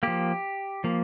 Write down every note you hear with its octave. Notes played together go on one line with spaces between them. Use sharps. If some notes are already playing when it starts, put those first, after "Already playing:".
F3 A#3 G4
F3 A#3